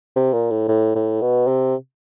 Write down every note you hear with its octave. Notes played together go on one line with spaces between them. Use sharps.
C3
A#2
A2
A2
A2
B2
C3